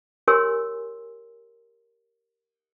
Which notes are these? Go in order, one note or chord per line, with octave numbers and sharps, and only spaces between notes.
G4 A#4 C#5 G#5 C6 E6